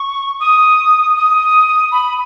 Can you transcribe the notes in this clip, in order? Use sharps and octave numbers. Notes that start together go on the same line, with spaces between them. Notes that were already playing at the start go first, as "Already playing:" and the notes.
Already playing: C#6
D#6
D#6
B5